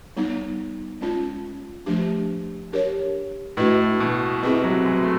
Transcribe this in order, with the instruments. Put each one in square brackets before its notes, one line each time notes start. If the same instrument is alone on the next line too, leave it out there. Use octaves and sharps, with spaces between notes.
[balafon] G3 B3 D#4
G#3 C#4 F4
F3 A3 D4 G4
D4 G4 A#4 C#5
[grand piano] A2 [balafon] A3 D4 F#4 B4 D#5
[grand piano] B2
[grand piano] C3 [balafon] C4 E4 G#4 B4 D#5
[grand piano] F#3
G#3
A3